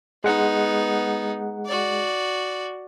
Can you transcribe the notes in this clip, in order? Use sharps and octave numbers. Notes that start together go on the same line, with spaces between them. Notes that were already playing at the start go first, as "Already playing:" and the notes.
G#3 B3 D#4 F#5
F#4 D5